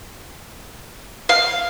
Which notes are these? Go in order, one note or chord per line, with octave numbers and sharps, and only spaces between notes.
F5